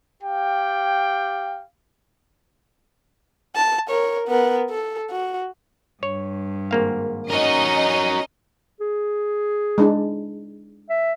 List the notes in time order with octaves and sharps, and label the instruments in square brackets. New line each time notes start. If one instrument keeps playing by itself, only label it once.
[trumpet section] G4 F5 G5
[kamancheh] A5
A#4 C#5
B3 A#4
A4
F#4
[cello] G2 [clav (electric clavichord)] C#5
[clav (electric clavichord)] G#1 A#3 F5
[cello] C#4 [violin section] D#4 D#5 [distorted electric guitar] F#4 A#4
[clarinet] G#4
[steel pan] G#3 D4 E4
[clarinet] E5